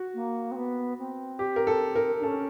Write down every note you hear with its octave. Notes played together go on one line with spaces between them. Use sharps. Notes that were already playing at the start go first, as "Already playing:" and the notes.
Already playing: F#4
A#3
C4
B3
C4
G4
A#4
A4
A#4
D4
C#4 A4